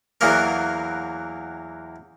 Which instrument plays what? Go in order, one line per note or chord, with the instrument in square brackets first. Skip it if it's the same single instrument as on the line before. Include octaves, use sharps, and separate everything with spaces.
[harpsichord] E2 E3 F#3 A#3 A#4